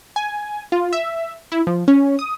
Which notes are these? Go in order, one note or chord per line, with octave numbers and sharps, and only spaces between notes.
G#5
F4
E5
E4
F3
C#4
D#6